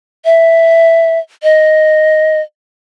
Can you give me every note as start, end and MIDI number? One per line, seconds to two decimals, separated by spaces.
0.25 1.19 76
1.43 2.41 75